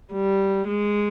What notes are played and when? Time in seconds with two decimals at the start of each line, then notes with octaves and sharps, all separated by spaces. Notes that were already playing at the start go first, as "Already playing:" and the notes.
0.13 G3
0.67 G#3